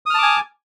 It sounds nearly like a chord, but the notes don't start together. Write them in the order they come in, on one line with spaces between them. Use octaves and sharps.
D#6 F6 A5 D6 G#5